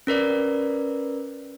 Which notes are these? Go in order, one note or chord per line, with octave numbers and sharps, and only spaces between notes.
C#4 A#4 B4 D5